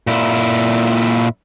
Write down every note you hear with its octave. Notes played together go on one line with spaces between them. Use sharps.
A#2 E4